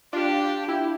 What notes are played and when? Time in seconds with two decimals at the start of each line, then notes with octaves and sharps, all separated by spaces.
0.13 D4 F4 G4
0.68 E4 G4